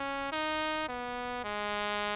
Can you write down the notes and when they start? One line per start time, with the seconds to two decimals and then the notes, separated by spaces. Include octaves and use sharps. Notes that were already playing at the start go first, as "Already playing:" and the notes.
Already playing: C#4
0.32 D#4
0.89 B3
1.44 G#3